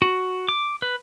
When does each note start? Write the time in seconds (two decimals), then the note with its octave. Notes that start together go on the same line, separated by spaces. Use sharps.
0.02 F#4
0.49 D6
0.82 B4